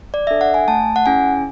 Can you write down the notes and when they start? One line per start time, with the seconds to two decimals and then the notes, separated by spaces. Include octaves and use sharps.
0.14 D5
0.27 D4 A4 E5
0.41 F#5
0.54 G#5
0.68 A3 A5
0.96 F#5
1.06 C#4 E4 G#4 G#5